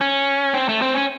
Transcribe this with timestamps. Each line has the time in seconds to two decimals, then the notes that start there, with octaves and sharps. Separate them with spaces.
0.01 C#4
0.54 C4
0.69 A3
0.82 C4
0.95 C#4